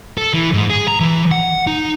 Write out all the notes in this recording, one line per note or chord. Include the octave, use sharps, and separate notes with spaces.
A4
E3
G#2
G#4
A#5
E3
F#5
D#4